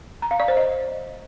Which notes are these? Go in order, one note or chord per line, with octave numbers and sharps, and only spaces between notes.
A#5
F5
D5
C5
D#5